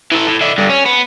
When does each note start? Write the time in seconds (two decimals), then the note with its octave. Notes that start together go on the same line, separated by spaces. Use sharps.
0.12 E3 A4
0.27 A2
0.41 D3 E4
0.58 G2 D3
0.69 C#4
0.85 B3